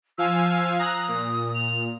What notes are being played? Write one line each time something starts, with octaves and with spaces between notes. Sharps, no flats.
F3 F5 G#5 E6
A#5 D#6 F#6
A#2
F7